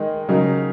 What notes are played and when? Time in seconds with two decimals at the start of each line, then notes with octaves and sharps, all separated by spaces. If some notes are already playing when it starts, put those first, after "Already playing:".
Already playing: D#3 G#3 D#4 G#4
0.29 C#3 F#3 D#4 A#4